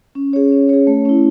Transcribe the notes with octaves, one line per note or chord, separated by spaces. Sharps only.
C#4
G#4 C#5
C#4
G#4 C#5
A3
C#4 E4